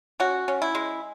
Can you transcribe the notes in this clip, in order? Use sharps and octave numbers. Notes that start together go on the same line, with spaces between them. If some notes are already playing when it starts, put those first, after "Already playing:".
C#4 F#4
C#4
E4
G#3